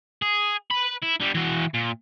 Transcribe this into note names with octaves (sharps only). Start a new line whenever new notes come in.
G#4
B4 B5
E4
D3 G3
E3 F#4
A#2